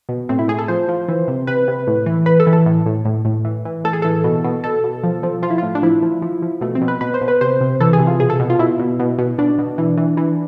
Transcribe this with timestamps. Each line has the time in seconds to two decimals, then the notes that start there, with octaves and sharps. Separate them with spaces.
0.09 B2
0.29 A2 C4
0.39 E4
0.48 A2 G#4
0.59 A4
0.68 F3 C5
0.89 F3
1.08 E3
1.28 C3
1.47 C3 B4
1.68 C3
1.87 A2
2.06 E3
2.26 A2 B4
2.40 A4
2.47 E3
2.53 A4
2.66 A2
2.86 A2
3.05 A2
3.25 A2
3.45 E3
3.65 E3
3.84 A2 A4
3.93 G#4
4.02 E3 A4
4.24 B2
4.44 B2
4.64 B2 A4
4.84 B2
5.03 F3
5.23 F3
5.43 F3 F4
5.51 E4
5.58 A2 F4
5.75 D4
5.83 F3 E4
6.03 F3
6.22 F3
6.42 F3
6.61 B2 A3
6.75 C4
6.82 B2
6.88 B4
7.01 B2 B4
7.14 C5
7.22 B2
7.28 B4
7.41 C3 C5
7.61 C3
7.80 E3 A4
7.93 G#4
7.99 C3
8.07 F4
8.20 B2 G#4
8.30 A4
8.40 B2
8.50 F4
8.59 B2 E4
8.79 B2
8.99 B2
9.19 B2
9.38 B2 D4
9.59 B2
9.78 E3
9.97 E3
10.17 E3